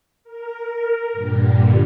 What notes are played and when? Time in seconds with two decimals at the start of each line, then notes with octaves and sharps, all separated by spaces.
0.24 A#4
1.12 G2 A#2 D3 G3